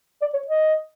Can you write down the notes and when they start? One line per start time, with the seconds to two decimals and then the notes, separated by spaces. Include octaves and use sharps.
0.22 D5
0.34 C#5
0.47 D#5